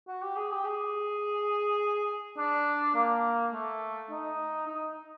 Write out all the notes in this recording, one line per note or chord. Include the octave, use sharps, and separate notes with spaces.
F#4
G4
G#4
G4
G#4
D4
A#3
A3
D#4
D#4